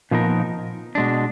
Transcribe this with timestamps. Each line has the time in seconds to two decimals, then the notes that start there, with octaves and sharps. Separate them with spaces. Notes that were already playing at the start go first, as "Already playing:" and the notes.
0.11 A#2 F3 B3 D#4 A#4
0.95 B2 G#3 D4